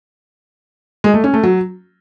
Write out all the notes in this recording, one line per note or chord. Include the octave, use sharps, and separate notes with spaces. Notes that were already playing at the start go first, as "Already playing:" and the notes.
G#3
A3
C#4
A3
F#3